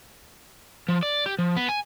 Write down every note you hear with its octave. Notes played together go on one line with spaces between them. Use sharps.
F3
D5
G4
F3
B3
G#5